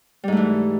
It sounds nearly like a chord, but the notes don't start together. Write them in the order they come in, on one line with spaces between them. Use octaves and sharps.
G3 G#2 A3 E3